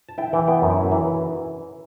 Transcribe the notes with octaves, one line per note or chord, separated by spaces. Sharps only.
A5
E4 G5
E3 G5
B3 G5
F#2
E4
E3